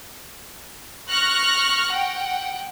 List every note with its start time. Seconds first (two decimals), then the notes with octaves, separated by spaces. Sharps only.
1.09 C#6 F6 F#6 A#6
1.91 F#5 G5